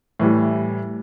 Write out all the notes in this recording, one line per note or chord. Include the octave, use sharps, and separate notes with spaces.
A2 E3 G3